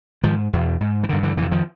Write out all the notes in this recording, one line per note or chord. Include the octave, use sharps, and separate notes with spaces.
G#2 D#3 F3
E2 B2
G#2
E3
G2 D3 D#3
D3 E3
F2 D3 E3
C3
D#3 F3